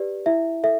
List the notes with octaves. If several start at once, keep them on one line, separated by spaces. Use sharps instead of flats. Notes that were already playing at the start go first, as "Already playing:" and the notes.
Already playing: G4 B4 D5
E4 E5
A4 E5